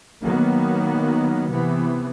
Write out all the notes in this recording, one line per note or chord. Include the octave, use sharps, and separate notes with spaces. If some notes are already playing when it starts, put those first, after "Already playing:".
D#3 F#3 A#3 B3
C3 E3 B3